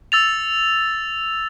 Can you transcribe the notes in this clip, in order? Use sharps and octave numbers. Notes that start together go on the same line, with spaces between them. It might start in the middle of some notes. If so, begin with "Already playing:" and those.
E6 A6 F7